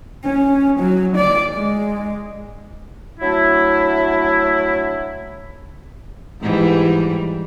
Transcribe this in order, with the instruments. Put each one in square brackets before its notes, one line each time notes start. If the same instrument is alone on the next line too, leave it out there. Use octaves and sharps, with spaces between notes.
[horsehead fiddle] C#4
F#3
D5
G#3
[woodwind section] F#3 A3 D4 E4
[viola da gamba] G#2 E3 G3